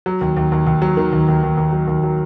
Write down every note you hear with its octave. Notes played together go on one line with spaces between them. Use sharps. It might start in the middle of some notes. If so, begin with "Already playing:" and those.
F#3
D#2
D#2
D#2
D#2
F#3
D#3
D#2
D#2
D#2
D#2
F#3
D#2
F#3